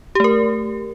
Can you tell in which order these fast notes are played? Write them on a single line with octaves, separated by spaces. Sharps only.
G4 A3 A#4